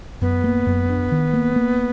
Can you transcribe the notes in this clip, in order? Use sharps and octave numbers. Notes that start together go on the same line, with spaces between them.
F#2 B3
A#3
F#2
D4
D#3
A#3
A#3